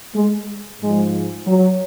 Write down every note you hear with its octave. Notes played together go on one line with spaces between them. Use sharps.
G#3
G#2 F3 G#3
F#3